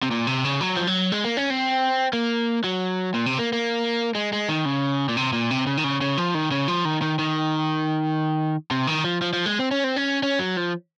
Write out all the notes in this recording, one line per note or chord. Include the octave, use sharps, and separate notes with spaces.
C3
A#2
C3
C#3
F#3
F3
F#3
G#3
A#3
C#4
C4
A#3
F#3
A#2
C3
A#3
A#3
G#3
G#3
D#3
C#3
A#2
C3
A#2
C3
C#3
D#3
C#3
C#3
F3
D#3
C#3
F3
D#3
D#3
D#3
C3
D#3
F3
F3
F3
G#3
C4
C#4
C4
C#4
C#4
F#3
F3